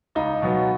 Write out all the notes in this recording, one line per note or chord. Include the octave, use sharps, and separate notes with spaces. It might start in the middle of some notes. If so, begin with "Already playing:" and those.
C#2 D#4
B2 F#3 B3